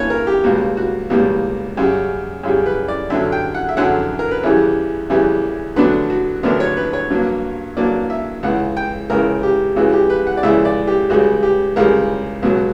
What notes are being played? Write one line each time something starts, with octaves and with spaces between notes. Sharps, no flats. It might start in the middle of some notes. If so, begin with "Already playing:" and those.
Already playing: G2 E3 A#3 C#4 B4 C#5
A#4
G4
C#2 B2 G3 A#3 F#4
F#4
C#2 B2 G3 A#3
F#2 C#3 G3
F#2 C#3 G3
B4
D5
F#2 D3 F#3 E5
G5
F#5
E5
F#2 D3 F#3 F#5
A#4
B4
E2 C#3 E3 G3 C#5
E2 C#3 E3 G3
D2 D3 F#3 B3 D4 B4
F#4
D2 D3 F#3 B3 D4 A#4
C#5
B4
C#5
G2 F#3 A#3
G2 F#3 A#3 D5
E5
C#2 C#3 E3 F#5
G5
C#2 C#3 E3 A#4
G4
C#2 C#3 E3 F#4
G4
B4
F#5
D5
C#2 C#3 E3 E5
D5
G4
C#2 C#3 G3 F#4
G4
C#2 C#3 G3 A#4
C#2 B2 F#3